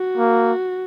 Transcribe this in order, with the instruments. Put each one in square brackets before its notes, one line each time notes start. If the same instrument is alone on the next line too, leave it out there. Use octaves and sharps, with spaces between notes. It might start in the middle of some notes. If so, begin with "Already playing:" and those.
Already playing: [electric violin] F#4
[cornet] A#3